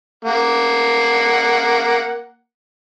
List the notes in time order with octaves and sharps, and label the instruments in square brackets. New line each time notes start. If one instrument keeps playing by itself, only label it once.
[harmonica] A#3 F#5